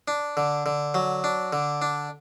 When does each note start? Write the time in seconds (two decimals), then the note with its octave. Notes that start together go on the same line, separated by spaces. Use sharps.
0.08 D4
0.37 D3
0.66 D3
0.94 F#3
1.24 D4
1.53 D3
1.82 D4